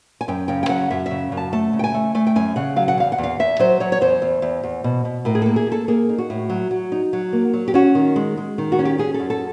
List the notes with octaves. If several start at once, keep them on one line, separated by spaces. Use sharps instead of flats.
G#5
F#2 G5
C#3 G5
G5
F#3 F#5
F#2 E5
E5
C#3
F#2
A5
A3 A5
C#3
G5
G#5
A3
A3 G#5
G5
F#2 G#5
C#3 F#5
F#3 F5
F#5
E2 F5
F#5
E2
F5
E2 E5
F#3 C5
F#3 C#5
C#5
E2 C5
E2
E2
E2
B2
B2
A2 A#4
G#4
A#3 A4
G#4
A#3 A4
A#3 G#4
D#4
F#4
A2
F#3
F#3
D#4
F#3
A#3
F#3
G4
C#4 F#4
D#3
G#3
G#3
D#3
F#4
C#4
G4
C#4 G#4
A4
F#2
A4